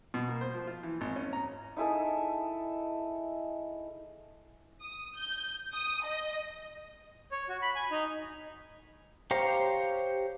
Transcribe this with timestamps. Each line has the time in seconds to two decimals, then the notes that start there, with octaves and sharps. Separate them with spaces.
0.14 B2
0.28 A#3
0.41 C5
0.54 F3
0.67 F4
0.83 E3
1.01 G#1
1.16 C#4
1.33 A#5
1.76 D#4 E4 G#4 A4
4.81 D#6
5.16 G6
5.73 D#6
6.04 D#5
7.32 C#5
7.49 F#4
7.62 B5
7.75 G#5
7.91 D#4
9.31 G4 C5 C#5 F5 A#5